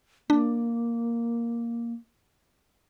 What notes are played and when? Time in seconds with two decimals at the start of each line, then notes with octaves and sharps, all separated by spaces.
0.30 A#3 D4